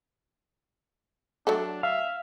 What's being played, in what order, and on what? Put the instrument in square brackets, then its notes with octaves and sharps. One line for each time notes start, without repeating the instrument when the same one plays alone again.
[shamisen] F#3 A3 A4 [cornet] D4
[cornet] E5 [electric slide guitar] F5